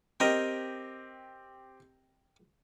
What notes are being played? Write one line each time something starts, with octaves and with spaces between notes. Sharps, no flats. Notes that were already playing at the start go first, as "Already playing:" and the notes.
C4 G4 A#4 D#5 G5